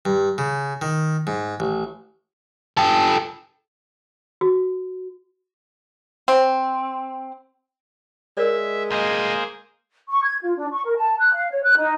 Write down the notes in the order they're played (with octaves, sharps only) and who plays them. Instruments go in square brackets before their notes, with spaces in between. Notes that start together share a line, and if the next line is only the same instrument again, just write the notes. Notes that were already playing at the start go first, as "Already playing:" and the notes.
[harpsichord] G2
C#3
D#3
G#2
A1
[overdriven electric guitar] G4 A4
[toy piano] F#4
[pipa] C4
[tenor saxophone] G#3 [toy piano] A#4 C#5 D5 [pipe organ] E5
[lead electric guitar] D2 D#5 [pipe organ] A#3 G#4 C5
[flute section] C#6
G#6
F4
D4
C#6
A#4
A5
F#6
F5
C#5
F#6
D#4